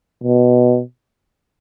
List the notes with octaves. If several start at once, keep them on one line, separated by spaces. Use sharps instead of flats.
B2